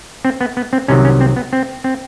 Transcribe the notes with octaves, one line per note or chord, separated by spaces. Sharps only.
C4
B3
B3
C4
C2 C3 D#3 F#3 C#4
C#4
C4
B3
C4
C4